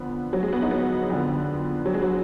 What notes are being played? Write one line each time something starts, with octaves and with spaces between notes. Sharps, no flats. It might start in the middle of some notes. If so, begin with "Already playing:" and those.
Already playing: F2 D3 B3
F#3
G#3
B3
D#4
B3
F2 D3 B3
F#3
G#3
F#3